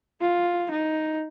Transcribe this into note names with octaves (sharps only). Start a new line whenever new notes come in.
F4
D#4